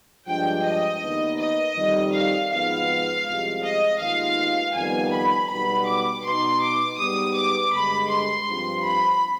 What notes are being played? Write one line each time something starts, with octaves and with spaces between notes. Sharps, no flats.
G2 F3 G#3 D4 G5
D#5
D#2 D#3 B3 D#4
D#5
F2 D#3 G3
F5
G#1 G#2 F3 B3 F5
C2 C3 F3 G#3
D#5
D#2 D#3 G#3 B3 F4 F5
F2 D#3 G3 B3 G#5
B5
B1 B2 G3 B3 B5
D6
B2 B3 D#4 C6
D6
G#2 G3 B3 D#6
D6
G2 D3 G#3 B5
C6
G2 F3 C4
B5